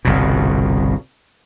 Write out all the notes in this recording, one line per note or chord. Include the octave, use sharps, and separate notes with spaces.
G1 C2 B2